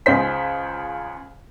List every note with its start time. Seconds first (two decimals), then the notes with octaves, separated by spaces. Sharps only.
0.06 C#2 C#3 C5 B6